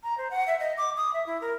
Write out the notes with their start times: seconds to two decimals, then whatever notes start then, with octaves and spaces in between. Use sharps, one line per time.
0.03 A#5
0.18 C5
0.31 F#5
0.47 E5
0.60 D#5
0.77 D6
0.97 D#6
1.13 E5
1.26 E4
1.41 A#4